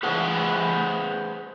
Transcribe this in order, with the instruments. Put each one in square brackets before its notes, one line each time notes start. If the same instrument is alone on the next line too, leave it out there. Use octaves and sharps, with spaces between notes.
[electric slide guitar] G#4 B4 C5 F#5 A5